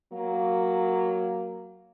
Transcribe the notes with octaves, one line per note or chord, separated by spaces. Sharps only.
F#3 A#3